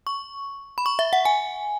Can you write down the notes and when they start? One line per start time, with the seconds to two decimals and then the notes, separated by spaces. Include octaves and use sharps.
0.07 C#6
0.78 B5
0.86 C#6
0.99 E5
1.13 F#5
1.25 G#5